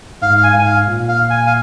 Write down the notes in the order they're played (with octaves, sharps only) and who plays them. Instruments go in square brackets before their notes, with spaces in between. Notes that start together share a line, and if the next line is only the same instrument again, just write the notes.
[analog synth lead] G#2 [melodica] F5
[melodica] F5
G#5
[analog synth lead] G#2 [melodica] G#5
[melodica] F5
[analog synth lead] A#2
[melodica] F5
G#5
F5